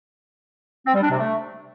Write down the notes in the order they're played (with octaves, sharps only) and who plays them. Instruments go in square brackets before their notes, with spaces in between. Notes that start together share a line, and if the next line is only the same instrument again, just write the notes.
[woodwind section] C4
G3
D4
C3
A3